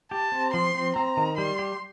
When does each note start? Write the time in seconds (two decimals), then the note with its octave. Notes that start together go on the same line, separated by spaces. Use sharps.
0.11 G4 A5
0.32 C4
0.53 F3 C6
0.74 C4
0.96 C4 A#5
1.17 D#3
1.37 G3 C6
1.59 G4